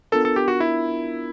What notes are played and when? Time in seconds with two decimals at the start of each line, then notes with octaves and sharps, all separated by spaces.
0.12 B3 D4 F4 A4 A#4
0.25 A4
0.36 G4
0.48 F#4
0.60 E4